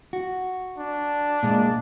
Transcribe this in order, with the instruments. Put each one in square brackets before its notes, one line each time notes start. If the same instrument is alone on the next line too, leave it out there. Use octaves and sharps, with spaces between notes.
[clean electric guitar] F#4
[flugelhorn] D4
[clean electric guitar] A#2 G#3